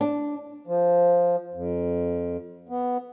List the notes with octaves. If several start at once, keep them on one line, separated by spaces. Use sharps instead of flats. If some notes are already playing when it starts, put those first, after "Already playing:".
D4
F3
F2
B3